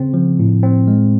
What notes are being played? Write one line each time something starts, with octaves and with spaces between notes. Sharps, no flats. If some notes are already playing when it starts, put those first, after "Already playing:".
Already playing: C#3 C4
F3
A2
C4
G#3